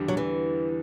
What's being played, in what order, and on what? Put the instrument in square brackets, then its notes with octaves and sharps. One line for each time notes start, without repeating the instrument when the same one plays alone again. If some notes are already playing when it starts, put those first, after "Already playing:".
Already playing: [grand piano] E2 D3 G3 D4
[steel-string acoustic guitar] F#3
E3